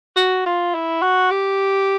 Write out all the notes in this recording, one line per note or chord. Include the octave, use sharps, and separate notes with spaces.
F#4
F4
E4
F#4
G4